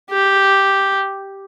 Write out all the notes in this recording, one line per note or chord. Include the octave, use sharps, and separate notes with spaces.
G4